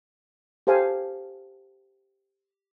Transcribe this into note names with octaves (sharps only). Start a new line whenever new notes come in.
G4 A4 C5 F5 G#5